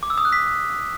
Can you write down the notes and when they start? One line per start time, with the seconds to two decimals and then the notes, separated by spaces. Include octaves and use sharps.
0.03 D6
0.10 E6
0.18 D#6
0.25 F#6
0.32 B6